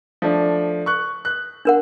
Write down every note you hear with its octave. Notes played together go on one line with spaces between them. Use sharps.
F3 A3 D4
C#6 F#6
F#6
D4 A#4 F#5